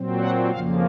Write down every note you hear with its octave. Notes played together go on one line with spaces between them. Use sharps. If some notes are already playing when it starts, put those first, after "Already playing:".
Already playing: A#2 F#3 C4
F#5
F2 C#3 F3 A#3 F5